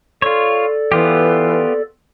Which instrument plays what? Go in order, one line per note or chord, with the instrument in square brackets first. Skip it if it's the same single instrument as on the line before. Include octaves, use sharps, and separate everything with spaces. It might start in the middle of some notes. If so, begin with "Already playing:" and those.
[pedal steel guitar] F4 C#5 [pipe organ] A4 D5
[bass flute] E3 [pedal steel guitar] B3 F4 G4